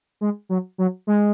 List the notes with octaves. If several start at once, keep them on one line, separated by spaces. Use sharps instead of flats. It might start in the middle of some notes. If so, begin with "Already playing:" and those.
G#3
F#3
F#3
G#3